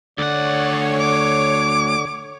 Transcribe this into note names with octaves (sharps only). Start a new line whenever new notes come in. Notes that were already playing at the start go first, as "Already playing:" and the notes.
D2 D3 C#5 D5 F#5
D6